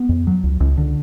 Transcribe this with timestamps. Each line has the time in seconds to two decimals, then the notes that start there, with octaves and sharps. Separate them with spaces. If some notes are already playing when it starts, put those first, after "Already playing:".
Already playing: B3
0.09 F2
0.27 F#3
0.44 C#2
0.60 C#2
0.77 D3